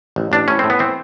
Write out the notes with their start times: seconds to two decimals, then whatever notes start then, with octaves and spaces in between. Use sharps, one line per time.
0.16 A1
0.32 A1 D4
0.48 A2 C#4
0.59 A2 C4
0.70 B3
0.79 E3 C4